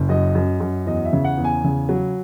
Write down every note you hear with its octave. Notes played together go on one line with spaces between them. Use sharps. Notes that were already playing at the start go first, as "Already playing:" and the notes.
Already playing: F#1
F#2 D#5
F#2
F#2
E2 D#5
E5
C#3
F#5
E2
G#5
C#3
F#3